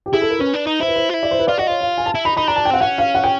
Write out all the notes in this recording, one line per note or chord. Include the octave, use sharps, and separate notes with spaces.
G4
E4 G#4
A4
A#4
C#4 B4
D4
D#4
E4 C5
B4
C5
F4
E4
D5
C5
B4
F4 D5
F#4 D#5
F4 C#5
F5
G#5
A5
E4
D#4 B5
D#4 B5
D4 A#5
A5
G5
C4 F#5
C#4 F#5
F5
F#5
G5